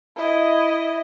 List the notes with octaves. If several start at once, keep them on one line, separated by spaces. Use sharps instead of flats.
E4 D#5